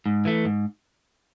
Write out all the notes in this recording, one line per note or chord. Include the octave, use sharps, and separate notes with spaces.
G#2
E3 A3
G#2